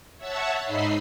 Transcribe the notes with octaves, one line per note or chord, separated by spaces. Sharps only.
C#5 E5 F#5 A5 E6
G#2 D#4 D#5 B5 C7